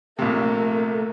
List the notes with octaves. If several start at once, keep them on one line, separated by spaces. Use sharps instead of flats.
A#1 C3 A3 A#3